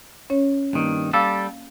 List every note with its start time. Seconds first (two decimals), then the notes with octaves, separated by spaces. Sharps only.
0.30 C#4 C#5
0.73 G2 D#3 A#3
1.13 G3 A4 F5 E6